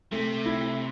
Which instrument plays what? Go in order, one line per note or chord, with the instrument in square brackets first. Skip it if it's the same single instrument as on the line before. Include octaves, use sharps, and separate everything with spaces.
[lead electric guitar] C3 [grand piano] A3
[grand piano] E4